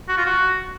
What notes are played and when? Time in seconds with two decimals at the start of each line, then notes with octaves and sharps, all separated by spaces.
0.08 F#4
0.17 F4
0.26 F#4